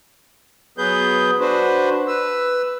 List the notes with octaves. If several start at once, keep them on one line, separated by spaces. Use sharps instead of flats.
F#3 B3 G#4 B4 G6
D4 F#4 B4 C5
B4 E6